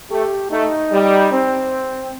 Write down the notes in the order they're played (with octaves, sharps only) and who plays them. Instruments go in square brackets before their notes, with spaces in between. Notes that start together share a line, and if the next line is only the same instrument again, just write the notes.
[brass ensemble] A3 [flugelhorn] G4
[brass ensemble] A3 [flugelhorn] D#4
[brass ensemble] G3
[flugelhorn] C4